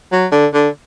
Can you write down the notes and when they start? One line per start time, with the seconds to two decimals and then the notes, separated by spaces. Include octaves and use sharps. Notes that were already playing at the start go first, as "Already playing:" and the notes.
0.12 F#3
0.32 D3
0.54 D3